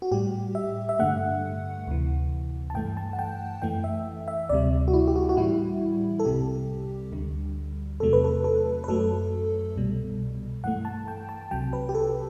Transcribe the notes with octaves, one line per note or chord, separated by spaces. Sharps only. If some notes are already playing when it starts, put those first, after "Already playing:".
F#4
A2 G3 G4
E5
E5
G2 D3 A3 F#5
D2 C3 E3
A5
G2 E3 A3 G5
A5
F#5
G5
F#2 E3 A3 G5
E5
E5
D2 C3 G3 D5
F#4
E4
G4
F#4
F#4
A2 E3 G3 E4
A4
C2 C3 G3 G4
D2 D3 G3
E2 C3 F#3 A3 A4
B4
A4
A4
B4
F#2 F#3 A3 A4
C2 B2 G3
G2 E3 A3 F#5
A5
G5
A5
C2 C3 F#3 G5
B4
G4
A4